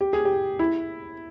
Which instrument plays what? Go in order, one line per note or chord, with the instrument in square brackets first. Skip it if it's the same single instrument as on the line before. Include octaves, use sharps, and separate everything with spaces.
[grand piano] G4
G#4
G4
E4